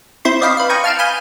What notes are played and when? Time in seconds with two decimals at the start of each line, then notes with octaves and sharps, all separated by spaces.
0.25 C4 E4 C5 B5 C6
0.41 D5 D#5 F5 G5 B5 C6
0.57 B4 F5
0.69 G5 A#5 C#6 D#6 G#6
0.84 F5 A5 F6 C7 D7 E7
0.99 F5 G#5 B5 D#6 G6